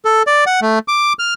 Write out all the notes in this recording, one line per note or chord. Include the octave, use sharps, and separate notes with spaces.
A4
D5
F#5
A3
D6
F6